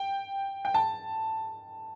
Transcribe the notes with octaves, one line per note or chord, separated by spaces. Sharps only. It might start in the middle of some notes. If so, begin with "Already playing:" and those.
Already playing: G5
G5
A5